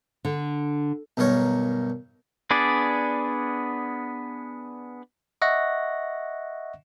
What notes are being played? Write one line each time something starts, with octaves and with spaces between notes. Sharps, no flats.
D3
B1 G2 D#3 A#4 C#5
B3 D4 G#4 D5
D#5 E5 F#5 C#6 F#6 A#6